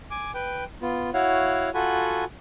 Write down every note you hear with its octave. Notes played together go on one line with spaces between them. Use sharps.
G#5 D6
B4 G5
B3 F4
E4 F#4 C#5 F5 F#5
F4 F#4 A4 F#5 G#5 B5